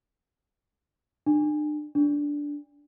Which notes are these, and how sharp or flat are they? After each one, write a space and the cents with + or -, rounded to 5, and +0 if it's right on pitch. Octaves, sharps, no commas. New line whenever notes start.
D4 +40
D4 -10